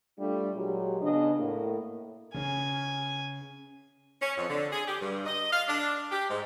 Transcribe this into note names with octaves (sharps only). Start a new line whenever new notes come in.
G3 A3 D4 F4
A#2 F#3 G#3 G4
C#3 B3 D4 D#5
A2 A#3
C#3 C#4 G#5
C#4
F2
D3
G#4
G4
G2
D#5
F5
D4
G4
G#2